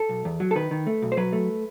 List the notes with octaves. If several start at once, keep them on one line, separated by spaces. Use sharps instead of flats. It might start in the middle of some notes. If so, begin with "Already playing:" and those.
Already playing: A4
B1
E2
F#3
A4
D#3 B4
D#3
A3
B1
C5
F#3 B4
A3